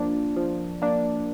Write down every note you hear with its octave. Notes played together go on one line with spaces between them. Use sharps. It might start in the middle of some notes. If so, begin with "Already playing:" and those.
Already playing: F3 A#3 D4
F3
A#3 D4